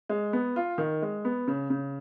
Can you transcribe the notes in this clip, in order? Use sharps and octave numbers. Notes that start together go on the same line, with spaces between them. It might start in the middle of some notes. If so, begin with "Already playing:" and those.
G#3
B3
F4
D#3
G#3
B3
C#3
C#3